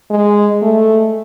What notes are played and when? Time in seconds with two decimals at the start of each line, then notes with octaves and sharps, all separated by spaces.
0.10 G#3
0.62 A3